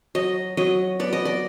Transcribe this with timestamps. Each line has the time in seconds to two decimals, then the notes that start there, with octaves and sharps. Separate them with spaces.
0.15 F#3 D#5
0.57 F#3 D#5
0.99 B3 D5
1.13 D#5
1.25 D5